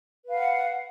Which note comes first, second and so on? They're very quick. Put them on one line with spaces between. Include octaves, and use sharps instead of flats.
B4 F5 F#5